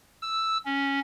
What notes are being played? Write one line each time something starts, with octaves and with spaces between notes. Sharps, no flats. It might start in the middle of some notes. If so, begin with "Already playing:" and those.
E6
C#4